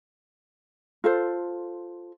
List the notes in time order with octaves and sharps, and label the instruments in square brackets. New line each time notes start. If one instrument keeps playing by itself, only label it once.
[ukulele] F4 A4 C5